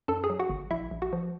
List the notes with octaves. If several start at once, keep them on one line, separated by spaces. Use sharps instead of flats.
F#2 A4 A5
G#4 G#5
F#3
F#4 F#5
G1
A#1 E4 E5
A#1
F#4 F#5
F3